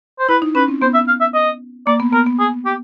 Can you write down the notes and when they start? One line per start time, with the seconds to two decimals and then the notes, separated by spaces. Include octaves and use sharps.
0.19 C5
0.29 E4 B4
0.42 D#4
0.55 C#4 B4
0.68 C4
0.82 B3 C5
0.94 E5
1.08 F5
1.21 E5
1.34 D#5
1.87 A#3 D5
2.00 B3
2.13 B3 A#4
2.26 B3
2.39 G#4
2.66 G4